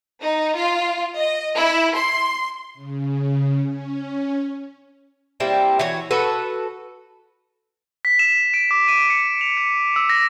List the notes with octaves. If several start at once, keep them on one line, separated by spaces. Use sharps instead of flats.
D#4
F4
D#5
E4
C6
C#3
C#4
G3 A#3 C4 E4
E3 F#4 C#5
F#4 A4 B4
B6
E7
D7
D6
D#7
C#7
F7
C#7
E6
A#6